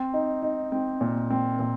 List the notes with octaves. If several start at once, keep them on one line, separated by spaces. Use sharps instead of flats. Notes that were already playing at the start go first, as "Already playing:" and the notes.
Already playing: C4
D#4
D#4
C4
A#2
C4
A#2